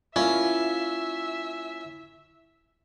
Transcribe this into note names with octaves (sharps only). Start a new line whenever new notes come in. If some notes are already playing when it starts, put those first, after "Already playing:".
A#3 C#4 E4 F4 E5